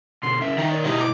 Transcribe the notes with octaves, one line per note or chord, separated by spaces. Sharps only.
B2 D3 C6
C#3 C#4 A#4 E5
D#3 D#4
A#2 C#5 D5
B2 F#3 G#3 E4 G4 D#5
D6